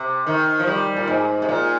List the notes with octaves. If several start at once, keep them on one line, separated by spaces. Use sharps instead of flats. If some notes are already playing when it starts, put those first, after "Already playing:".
Already playing: C3
D#3
F3
G3
A#2
G#2
C3
A#2